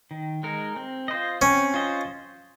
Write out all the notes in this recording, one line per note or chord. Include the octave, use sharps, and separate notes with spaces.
D#3
G#3 D#4 A#4
C4
F4 C5 D#5
C4 C#4
F4 C5 D#5